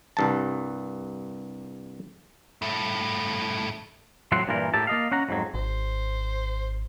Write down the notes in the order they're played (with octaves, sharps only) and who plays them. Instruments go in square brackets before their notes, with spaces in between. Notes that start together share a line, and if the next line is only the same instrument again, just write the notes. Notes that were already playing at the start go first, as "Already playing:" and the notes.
[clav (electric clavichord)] C2 G2 A5
[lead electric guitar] G2 A3
[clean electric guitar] A2 F#3 C4 F#5 C6
G2 A#2 E3 A#4
A2 G4 A#4 E5 A5
A#3 D#5 F5
C#4 F#5 A#5
F2 G#2 F#3
[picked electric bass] G#1 [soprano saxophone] C5